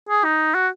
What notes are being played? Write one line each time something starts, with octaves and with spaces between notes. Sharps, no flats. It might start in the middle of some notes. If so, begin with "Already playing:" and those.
G#4
D#4
F#4